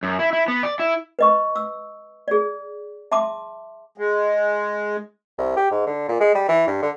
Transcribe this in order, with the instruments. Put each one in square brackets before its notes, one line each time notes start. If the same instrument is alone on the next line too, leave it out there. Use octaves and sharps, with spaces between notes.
[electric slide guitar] F#2
E4
E4
B3
D5
E4
[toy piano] B4 D#5 C#6
E6
G#4 D5
E5 A5 C6 D6
[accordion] G#3
[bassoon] C2
G4
G#2
D3
A#2
G#3
G3
E3
G2
D3